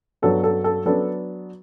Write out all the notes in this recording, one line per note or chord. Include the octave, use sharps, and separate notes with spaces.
G2 F#3 B3 D4 A4
A4
A4
F#3 B3 D4 A4